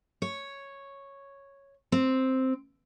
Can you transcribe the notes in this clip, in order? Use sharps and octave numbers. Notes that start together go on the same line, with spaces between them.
C#5
C4